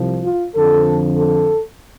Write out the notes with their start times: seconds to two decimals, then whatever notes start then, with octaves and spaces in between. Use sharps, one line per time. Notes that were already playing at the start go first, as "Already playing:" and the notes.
Already playing: C2 C3 F3
0.24 F4
0.55 F2 D3 F3 A4
1.18 A4